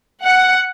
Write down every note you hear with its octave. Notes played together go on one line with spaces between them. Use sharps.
F#5